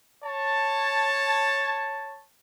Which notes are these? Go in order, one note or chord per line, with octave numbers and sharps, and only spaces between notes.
C#5 A5